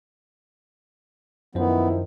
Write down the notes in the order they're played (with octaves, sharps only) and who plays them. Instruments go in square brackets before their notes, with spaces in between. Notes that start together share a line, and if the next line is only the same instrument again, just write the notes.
[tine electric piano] F#2 C5 [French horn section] D#3 F3 E4 [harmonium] B3